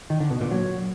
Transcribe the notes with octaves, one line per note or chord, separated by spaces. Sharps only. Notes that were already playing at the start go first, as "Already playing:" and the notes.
D#3
D3
B2
A#2
F#3